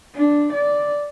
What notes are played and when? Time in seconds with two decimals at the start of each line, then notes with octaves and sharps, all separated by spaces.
0.15 D4
0.54 D5